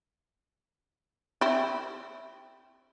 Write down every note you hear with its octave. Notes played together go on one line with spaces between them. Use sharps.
C4 E4